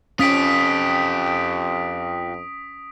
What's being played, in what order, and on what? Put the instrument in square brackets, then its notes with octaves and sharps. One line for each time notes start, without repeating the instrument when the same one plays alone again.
[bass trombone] F2 [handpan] C#4 [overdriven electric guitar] F4 G4 [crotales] D#6 B6 D7